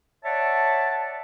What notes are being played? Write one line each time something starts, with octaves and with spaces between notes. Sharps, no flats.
C#5 D5 E5 F#5 A5